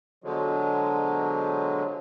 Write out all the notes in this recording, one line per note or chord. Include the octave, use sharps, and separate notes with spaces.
B2 D3 F3 F#3 G#3